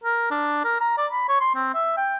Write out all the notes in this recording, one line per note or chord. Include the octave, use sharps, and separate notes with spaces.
A#4
D4
A#4
A#5
D5
B5
C#5
C6
C4
E5
G5